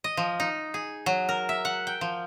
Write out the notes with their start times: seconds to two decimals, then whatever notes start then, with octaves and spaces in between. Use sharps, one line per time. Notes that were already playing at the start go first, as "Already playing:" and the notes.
0.04 D#5
0.17 F3
0.40 D#4
0.74 G#4
1.06 F#3
1.29 A#4
1.49 E5
1.65 F#5
1.87 G5
2.01 F3